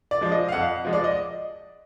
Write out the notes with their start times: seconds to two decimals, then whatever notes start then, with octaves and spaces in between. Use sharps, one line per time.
0.11 D5
0.21 F3 G#3
0.32 D#5
0.49 F5
0.52 F2 F#5
0.85 F3 G#3
0.93 D5
1.04 D#5